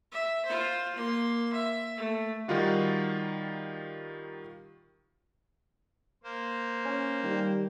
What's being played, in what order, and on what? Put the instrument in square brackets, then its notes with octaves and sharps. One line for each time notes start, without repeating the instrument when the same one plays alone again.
[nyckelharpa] E5
F4 C5
A#3 C6
E5
A3
[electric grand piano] D#3 G3 D#4 F4 F#4
[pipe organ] A#3 C5
[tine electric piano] C#4
[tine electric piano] D#3 [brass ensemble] G3